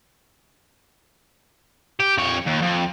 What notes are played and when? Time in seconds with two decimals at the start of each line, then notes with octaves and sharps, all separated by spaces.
2.00 G4
2.18 F2 C#5
2.47 D#2
2.62 F2